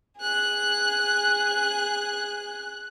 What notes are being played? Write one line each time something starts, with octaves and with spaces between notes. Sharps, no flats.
G#4 F#6